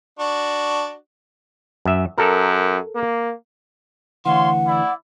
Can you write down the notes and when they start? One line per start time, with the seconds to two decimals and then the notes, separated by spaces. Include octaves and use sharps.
0.19 D4 F#4
1.85 F#2 E5
2.18 F#2 A4 A#4
2.95 A#3
4.26 D2 E3 C#5 F5 F#5 C6
4.66 E4 D5